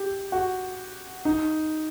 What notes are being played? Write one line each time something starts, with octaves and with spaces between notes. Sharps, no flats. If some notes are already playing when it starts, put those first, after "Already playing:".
Already playing: G4
F#4
D#4